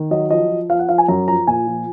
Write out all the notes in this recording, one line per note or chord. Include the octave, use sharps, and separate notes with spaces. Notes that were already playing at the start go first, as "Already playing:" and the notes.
Already playing: D#3
F#3 D#5
F3 D#5
F3
F3 F5
F#5
F3 F5
G#5
F#2 A#5
F3 A#5
A#2 G#5
F3